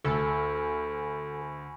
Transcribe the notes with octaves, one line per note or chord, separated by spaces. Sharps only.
D2 A4 G#5 B5 C#6